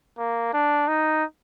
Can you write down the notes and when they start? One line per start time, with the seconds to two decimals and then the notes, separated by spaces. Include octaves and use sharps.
0.18 A#3
0.53 D4
0.88 D#4